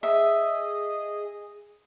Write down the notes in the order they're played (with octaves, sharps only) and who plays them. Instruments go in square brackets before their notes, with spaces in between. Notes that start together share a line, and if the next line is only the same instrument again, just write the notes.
[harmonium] G#4 D#5 [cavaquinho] E5